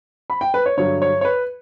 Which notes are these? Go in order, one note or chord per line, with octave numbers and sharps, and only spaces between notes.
B5
G5
B4
C#5
G2 D3 F#3 C#5
C#5
C#5
B4